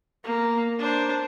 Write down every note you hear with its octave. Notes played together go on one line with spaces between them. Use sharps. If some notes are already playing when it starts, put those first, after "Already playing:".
A#3
D4 C5